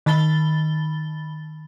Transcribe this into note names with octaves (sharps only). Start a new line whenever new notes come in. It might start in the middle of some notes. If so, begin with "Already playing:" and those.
D#3 A5 B5 A6 G7